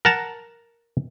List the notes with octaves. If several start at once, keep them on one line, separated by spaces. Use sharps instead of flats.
A#4 F#5 A5 A#5